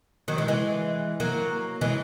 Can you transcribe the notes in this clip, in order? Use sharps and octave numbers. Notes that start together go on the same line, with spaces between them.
D#3 F#3
E3 G#3
E3 G#3
F#3 A#3
E3 G#3